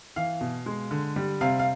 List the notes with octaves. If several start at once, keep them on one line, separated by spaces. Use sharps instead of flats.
E3 F5
B2
G#3
D3
G3
C3 F5
F5